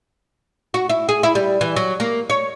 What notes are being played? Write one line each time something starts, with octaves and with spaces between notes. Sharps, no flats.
F#4
E4
G#4
E4
G3
E3
F#3
A#3
C#5